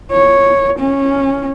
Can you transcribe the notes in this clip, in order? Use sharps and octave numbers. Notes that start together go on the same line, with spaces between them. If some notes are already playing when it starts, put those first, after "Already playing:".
C#5
C#4